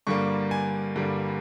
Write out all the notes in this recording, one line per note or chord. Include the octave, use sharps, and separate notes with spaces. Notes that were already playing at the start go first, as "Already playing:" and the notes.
G2 D3 G3 A#3 C#6
G#5
G2 D3 G3 A#3